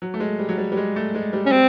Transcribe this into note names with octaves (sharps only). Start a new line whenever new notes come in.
F#3
A3
G#3
G3
F#3
G3
G3
G#3
A3
G#3
G3
C#4
G3 C4